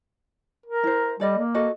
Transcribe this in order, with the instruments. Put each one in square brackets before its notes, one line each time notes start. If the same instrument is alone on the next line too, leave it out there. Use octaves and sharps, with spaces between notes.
[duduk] A#4
[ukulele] E4 C5
[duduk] G3 [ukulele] A4 D5 D#5
[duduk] A#3
[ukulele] F#4 A4 D#5